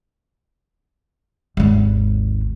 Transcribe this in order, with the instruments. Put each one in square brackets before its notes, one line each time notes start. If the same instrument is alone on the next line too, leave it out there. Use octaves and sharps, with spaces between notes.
[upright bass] G#1 D#2